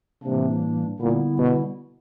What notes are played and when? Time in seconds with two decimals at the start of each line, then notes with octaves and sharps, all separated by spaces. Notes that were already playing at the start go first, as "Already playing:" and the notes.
0.23 A2 C3 E3 G3 A#3 D4
1.00 A#2 D3 G3 B3 E4
1.39 B2